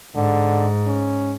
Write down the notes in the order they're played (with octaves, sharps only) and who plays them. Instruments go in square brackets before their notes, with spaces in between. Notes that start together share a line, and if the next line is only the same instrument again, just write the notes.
[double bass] G#2 [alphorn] D3
[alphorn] C#4